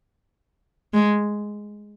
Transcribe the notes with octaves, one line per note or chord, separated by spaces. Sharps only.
G#3